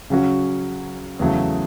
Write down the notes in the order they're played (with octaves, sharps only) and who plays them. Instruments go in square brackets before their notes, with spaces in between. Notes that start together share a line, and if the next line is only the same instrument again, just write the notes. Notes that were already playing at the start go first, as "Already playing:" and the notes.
[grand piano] C#3 F#3 C#4 F#4
E2 C#3 F#3 A3